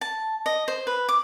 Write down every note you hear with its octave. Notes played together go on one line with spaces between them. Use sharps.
A5
D#5
C5
B4
D6